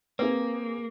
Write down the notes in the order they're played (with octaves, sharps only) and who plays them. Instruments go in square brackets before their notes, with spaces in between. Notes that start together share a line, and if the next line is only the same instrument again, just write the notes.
[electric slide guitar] A#3 [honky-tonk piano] C4 G#4 [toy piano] B4